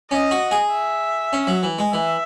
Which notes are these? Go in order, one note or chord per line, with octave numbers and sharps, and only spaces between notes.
C#4 D#5
F#4
G#4
E5
C#4
F#3
E3
G#3
E3 E5